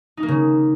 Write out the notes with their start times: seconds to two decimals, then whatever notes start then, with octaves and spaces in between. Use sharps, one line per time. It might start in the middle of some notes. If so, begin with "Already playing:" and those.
0.17 D#4
0.23 A#3
0.28 C#3